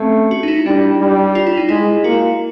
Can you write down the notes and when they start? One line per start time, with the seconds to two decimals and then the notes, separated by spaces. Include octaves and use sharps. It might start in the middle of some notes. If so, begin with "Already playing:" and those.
Already playing: A3 C4 C#4
0.31 F#4
0.43 D#4
0.48 E4
0.66 G3 D4
1.00 G3
1.35 F4
1.47 E4
1.57 D#4
1.69 G#3 E4
2.04 A#3 F#4